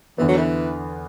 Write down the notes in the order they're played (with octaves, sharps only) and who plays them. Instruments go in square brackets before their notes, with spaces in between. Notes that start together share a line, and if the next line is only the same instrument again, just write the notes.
[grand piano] E2 D3 B3 [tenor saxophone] E3
[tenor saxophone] F#3
E3